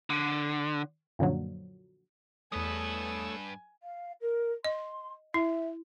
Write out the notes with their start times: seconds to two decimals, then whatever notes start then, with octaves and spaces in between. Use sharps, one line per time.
0.10 D3
1.19 F#2 A#2 D3 F3 F#3
2.52 E2 G2 A3 B4 C#5 G#5 D#6 E6
3.83 F5
4.21 A#4
4.65 D#5 C6
5.34 E4 E5